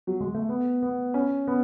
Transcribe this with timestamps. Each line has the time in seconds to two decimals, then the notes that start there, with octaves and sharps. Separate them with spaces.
0.07 F#3
0.20 G#3
0.34 A3
0.49 B3
0.82 B3
1.14 C#4
1.47 B3